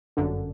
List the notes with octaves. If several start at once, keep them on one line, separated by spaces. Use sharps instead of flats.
G1 F#2 D3